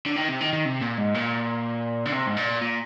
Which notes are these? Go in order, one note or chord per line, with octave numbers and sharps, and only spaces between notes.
D3
D#3
C3
D#3
D#3
C3
A#2
G#2
A#2
D3
C3
G#2
A#2
A#2